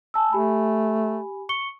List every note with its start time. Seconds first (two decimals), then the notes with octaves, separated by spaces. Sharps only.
0.14 G#5 A5 E6
0.32 A3 G4 G#5 B5
1.49 C#6 C#7 G7